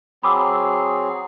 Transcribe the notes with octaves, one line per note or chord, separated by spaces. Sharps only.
F#3 C4 G#4 B5 D6 E6